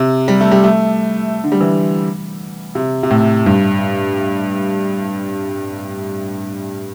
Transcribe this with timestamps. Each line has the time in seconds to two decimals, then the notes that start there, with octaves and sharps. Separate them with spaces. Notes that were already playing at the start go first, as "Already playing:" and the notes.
Already playing: C3
0.28 G3
0.41 A3
0.51 G3
0.64 A3
1.44 D3
1.52 G3
1.61 E3
2.75 C3
3.03 C3
3.10 A2
3.46 G2